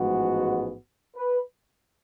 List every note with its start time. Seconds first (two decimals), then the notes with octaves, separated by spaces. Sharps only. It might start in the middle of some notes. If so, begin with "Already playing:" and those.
Already playing: A1 G#2 F3 G#3 B3 F#4
1.17 B4